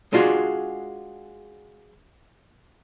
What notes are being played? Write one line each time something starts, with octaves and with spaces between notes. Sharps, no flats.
G#3 D4 F4 F#4 G#4